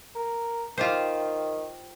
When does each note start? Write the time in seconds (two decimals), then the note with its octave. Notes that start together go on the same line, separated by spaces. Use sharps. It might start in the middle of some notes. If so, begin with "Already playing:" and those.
0.15 A#4
0.78 D#3 F4 G4 C5